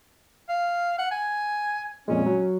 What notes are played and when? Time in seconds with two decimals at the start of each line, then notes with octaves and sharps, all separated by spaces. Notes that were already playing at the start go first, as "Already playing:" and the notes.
0.49 F5
0.99 F#5
1.11 G#5
2.08 F2 A#2 G#3 C#4
2.26 F#3